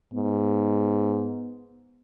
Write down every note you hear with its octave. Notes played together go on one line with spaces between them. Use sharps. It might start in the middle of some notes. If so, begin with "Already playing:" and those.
G#2 B3